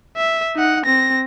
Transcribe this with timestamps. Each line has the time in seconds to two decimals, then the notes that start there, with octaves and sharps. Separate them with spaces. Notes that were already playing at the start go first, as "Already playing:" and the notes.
0.17 E5
0.55 D#4 F#5
0.85 C4 A#6